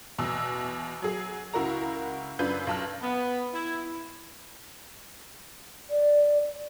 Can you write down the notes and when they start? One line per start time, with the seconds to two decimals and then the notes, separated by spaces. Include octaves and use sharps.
0.18 E2 B2 E6
1.02 F#3 G#4
1.54 C#2 E4 F#4 A#4 A#5
2.39 F#2 C#3 D4 F4 B4 G6
2.67 B1 A5 F6
3.02 B3
3.54 E4
5.90 D5